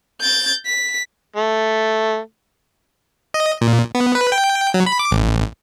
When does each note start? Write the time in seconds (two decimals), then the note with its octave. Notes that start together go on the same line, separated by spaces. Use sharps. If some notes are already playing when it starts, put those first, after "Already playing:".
0.21 G6 A6
0.67 B6
1.36 A3
3.34 D#5
3.61 A#2
3.95 B3
4.15 B4
4.32 G5
4.74 F#3
4.86 B5
4.99 D6
5.11 A1